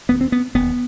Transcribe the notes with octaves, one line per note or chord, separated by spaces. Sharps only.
E1 D#2 B3
C4
B3
E1 D#2 B3